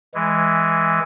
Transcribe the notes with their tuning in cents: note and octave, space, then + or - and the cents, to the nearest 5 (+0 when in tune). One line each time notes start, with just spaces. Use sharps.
E3 +0 G#3 +0